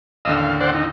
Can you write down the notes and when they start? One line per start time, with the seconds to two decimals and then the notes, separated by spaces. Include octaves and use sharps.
0.25 A1 D#2 D3 D#5 F5 E6
0.38 F5
0.61 C5 D5 F#5
0.75 D#4